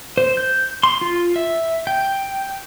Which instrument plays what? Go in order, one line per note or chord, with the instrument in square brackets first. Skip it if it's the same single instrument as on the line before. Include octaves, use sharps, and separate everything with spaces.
[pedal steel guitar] C5
G6
C6
F4
E5
G5